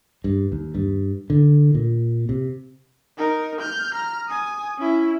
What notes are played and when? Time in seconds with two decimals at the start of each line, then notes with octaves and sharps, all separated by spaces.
0.24 G2
0.52 D#2
0.75 G2
1.30 D3
1.75 A#2
2.29 C3
3.18 D#4 A#4
3.61 F6 G6
3.94 A#5 F6
4.28 G#5 D#6
4.79 C#4 E4